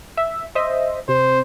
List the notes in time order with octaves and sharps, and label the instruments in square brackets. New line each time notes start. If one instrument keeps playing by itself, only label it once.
[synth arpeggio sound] E5
C5 D#5 E5
[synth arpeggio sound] C3 [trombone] C5